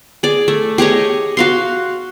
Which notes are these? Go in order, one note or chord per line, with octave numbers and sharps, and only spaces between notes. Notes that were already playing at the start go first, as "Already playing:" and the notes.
G#4 D5
A3
G4 G#4 C#5 D#5
F#4 F5 C6